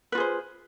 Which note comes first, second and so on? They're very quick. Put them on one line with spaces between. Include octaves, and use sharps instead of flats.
B4 F4 G#4 C5